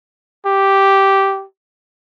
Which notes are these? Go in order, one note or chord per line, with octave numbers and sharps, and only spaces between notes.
G4